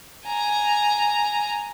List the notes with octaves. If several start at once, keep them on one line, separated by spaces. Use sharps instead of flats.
G#5 A#5